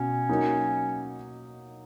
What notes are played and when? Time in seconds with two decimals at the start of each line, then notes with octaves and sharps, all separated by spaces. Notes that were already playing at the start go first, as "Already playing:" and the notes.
Already playing: B2 C#4
0.29 F#3 A#3 D#4